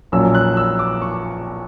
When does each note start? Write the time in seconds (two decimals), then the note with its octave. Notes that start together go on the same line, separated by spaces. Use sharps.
0.12 A#1 A#2 F#3 C#4 E6
0.35 F#6
0.57 E6
0.79 D6
1.02 C#6